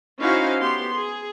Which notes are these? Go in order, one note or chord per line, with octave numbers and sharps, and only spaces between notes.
C#4 D#4 E4 F#4 C5 F5
B3 G4 C6
G#4